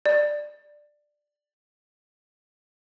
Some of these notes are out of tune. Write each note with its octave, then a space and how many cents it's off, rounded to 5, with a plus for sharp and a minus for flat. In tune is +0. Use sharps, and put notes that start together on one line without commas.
D5 +10